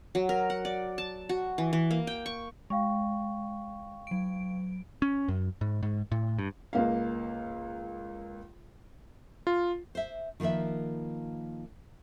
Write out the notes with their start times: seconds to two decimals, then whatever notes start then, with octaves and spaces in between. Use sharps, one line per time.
0.15 F#3
0.29 A#4
0.50 F#5
0.65 D5
0.98 A5
1.29 F#4
1.58 E3
1.73 E3
1.91 A#3
2.07 G5
2.26 C#6
2.70 G#3 F5 G5 C#6
4.07 F#3 D7
5.02 C#4
5.28 F#2
5.61 G#2
5.83 G#2
6.12 A2
6.39 G2
6.73 C#2 A#3 F5
9.47 F4
9.95 C5 E5
10.40 D#3 F3 A#3 B4 E5